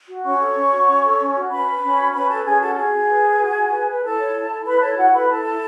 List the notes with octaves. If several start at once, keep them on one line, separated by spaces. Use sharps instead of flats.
F#4
C#4 C#5 C#6
A4
C#4
F#4
C#4
A4
C#4
F#4
C#4 B4 B5
B4
C#4
F#4
C#4 B4 B5
A4 B4 A5
C#4 G#4 G#5
F#4 A4 A5
F#4 G#4 G#5
F#4
B4
B4
F#4
F#4
B4
B4
E4 A4 A5
C#5
E4
A4
E4 B4 B5
A4 C#5 A5
E4 F#4 F#5
A4 B4 B5
E4 A4 A5
E4